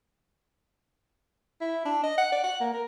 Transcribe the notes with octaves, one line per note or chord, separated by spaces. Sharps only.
E4
D4
D#5
F#5
D5
F#5
A#3
A#4